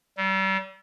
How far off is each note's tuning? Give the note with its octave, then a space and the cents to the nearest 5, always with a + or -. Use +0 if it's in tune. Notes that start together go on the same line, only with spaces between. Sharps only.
G3 -35